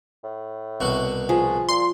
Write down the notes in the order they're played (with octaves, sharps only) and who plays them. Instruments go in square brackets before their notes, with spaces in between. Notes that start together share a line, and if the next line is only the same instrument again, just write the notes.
[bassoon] A2
[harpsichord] C2 B2 F#4
[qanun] F3 [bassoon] G#4
[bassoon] A#2 [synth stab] C6